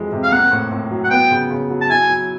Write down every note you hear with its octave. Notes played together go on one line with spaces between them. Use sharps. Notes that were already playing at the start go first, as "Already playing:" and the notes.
Already playing: F2 E3 F#3 G#3
C3
F5
A#3 F#5
A2
A2
F#3
F#5
B3 G5
C#3
C#3
F#3
A5
E4 G#5
F#3